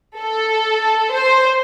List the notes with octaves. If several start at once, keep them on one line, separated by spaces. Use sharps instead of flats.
A4
C5